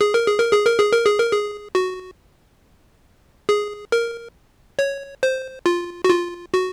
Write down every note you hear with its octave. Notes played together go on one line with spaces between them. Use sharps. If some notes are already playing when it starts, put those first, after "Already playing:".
G#4
A#4
G#4
A#4
G#4
A#4
G#4
A#4
G#4
A#4
G#4
F#4
G#4
A#4
C#5
C5
F4
F#4
F4
F#4